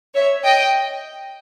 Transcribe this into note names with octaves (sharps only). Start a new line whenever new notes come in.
C#5 E5
D#5 G5